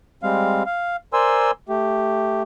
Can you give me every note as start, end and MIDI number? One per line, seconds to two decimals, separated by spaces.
0.23 0.63 55
0.23 0.63 56
0.23 0.63 60
0.23 0.63 77
0.66 0.96 77
1.13 1.51 70
1.13 1.51 72
1.13 1.51 74
1.13 1.51 80
1.13 1.51 84
1.13 1.51 88
1.69 2.43 57
1.69 2.43 67